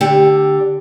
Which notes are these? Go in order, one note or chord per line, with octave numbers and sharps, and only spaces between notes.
D3 G4